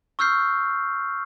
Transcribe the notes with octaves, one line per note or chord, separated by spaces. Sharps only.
C#6 E6 F6 G6 C7